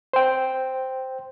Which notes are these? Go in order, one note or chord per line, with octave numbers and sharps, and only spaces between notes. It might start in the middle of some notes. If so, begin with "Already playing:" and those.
C5 G5